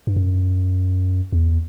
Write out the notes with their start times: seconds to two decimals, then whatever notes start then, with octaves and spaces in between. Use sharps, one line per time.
0.07 G2
0.16 F#2
1.32 E2